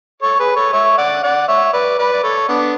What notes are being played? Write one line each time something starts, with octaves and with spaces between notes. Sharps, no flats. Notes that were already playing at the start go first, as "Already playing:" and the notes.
A4 C#5
G#4 B4
A4 C#5
C#5 E5
D5 F#5
D5 F#5
C#5 E5
B4 D5
B4 D5
D5
A4 C#5
B3 D4